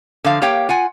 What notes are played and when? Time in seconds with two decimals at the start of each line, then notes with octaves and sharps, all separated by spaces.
0.24 D3 F3 F5
0.42 A#3 G4 C#5 F5 G5
0.69 F4 F#5 G#5